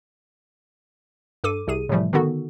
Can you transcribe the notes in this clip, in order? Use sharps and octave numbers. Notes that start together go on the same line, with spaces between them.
G2 A4 D6 D#7
C2 C3 G#4 D#7
A2 C3 E3 F3 G3 A3
D3 D#3 B3 D#4 F#4 A4